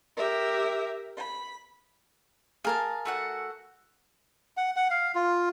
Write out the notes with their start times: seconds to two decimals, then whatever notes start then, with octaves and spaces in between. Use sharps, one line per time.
0.16 G4 A#4 E5
1.17 B5
2.65 G#4 A#4 F5 A5
3.05 A3 F#4 F#5
4.57 F#5
4.76 F#5
4.90 F5
5.15 F4